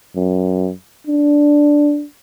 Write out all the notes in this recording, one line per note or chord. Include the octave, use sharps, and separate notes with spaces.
F#2
D4